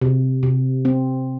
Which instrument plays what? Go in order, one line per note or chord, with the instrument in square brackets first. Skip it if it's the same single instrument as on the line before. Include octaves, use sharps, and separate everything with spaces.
[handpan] C3
C3
C4